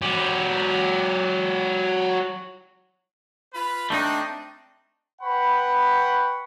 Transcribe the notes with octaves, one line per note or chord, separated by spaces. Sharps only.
F#3 G4
F4 B4 B5
A3 C4 D4 D#4
B4 F#5 G5 B5 C#6